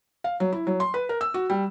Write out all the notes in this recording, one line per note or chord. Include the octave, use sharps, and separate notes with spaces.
F5
F#3
E4
F#3
C6
B4
A#4
E6
F#4
G3